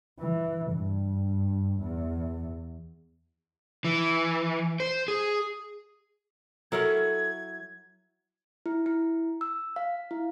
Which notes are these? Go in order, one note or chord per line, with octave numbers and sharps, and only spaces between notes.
E3
G2
E2
E3
C5
G#4
F#3 E4 A4 A#4 C#5 G#6
E4
E4
E6
F5
E4